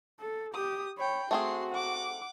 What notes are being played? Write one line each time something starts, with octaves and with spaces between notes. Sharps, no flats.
A4
G4 D#6
C#5 G5 B5
A3 C4 F#4 G#4 C6
F#5 D6